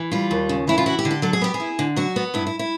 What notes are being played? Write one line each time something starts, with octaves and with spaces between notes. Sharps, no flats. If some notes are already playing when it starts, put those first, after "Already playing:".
Already playing: E3
G3 F4
D#2
C#3
E3 E4
F4
E4 F#4
G4
D3
G4
F#3 A4
G#4
B3 G4
G#4
E4
D3
F#3 F#4
B3
G2 E4
E4
E4